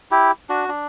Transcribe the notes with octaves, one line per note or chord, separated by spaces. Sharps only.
E4 G4
D4 F#4
D4